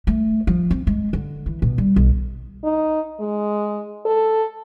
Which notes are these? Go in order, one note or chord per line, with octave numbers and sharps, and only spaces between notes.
A3
F3
C4
G#3
D3
E3
B2
G3
B1
D#4
G#3
A4